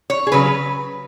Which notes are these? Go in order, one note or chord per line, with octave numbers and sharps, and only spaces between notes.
C#5
G#4
C#3 F#3 B4